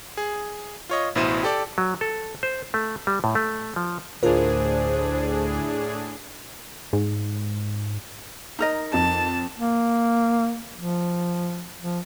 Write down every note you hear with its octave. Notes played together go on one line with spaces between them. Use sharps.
G#4
F4 C#5 D#5
A1 B2 E4 C5 D#7 E7
G4 A4 D5
F#3
A4
C5
A3
G3
A2
A3
F3
D2 A2 D4 F4 G#4 A#4 C5
G#2
D#4 A#4 D#5
F2 A5
A#3
F3
F3